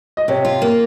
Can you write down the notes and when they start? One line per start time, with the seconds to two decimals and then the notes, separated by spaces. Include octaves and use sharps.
0.17 D#5
0.28 C3 C#5
0.45 F4
0.62 A#3